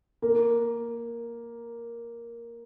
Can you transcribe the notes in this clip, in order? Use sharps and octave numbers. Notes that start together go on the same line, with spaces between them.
A#3